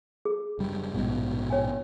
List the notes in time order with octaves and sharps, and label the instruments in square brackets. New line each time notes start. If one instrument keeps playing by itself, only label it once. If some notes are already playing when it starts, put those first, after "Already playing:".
[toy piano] G#4
[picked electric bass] F#1 G3
A#1 G#2 B2
[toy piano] C#5 G5 G#5